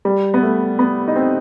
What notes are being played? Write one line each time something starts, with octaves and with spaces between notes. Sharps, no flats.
G3
B3
A3
B3
D#4
C4